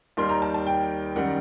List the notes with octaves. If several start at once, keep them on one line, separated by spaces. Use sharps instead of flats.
D#2 D#3 G3 C6
A#5
A5
A5
G5
F#2 D#3 G3 F#5